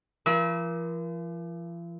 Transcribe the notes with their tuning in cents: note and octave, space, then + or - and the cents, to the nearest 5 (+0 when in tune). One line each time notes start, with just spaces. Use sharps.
F3 -45 A#4 +40 E6 -30